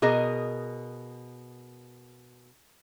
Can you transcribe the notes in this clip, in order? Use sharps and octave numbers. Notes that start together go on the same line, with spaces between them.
B2 G#4 A#4 D#5